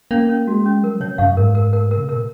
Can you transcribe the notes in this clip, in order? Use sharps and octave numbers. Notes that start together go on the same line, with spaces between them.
A#3 C#4
C#4
G#3 F#4
C#4
F#3 A#4
C3 C#5
F#2 F5
G#2 A#4
A#4
A#4
A#4
C#3
C3
A#2 A#4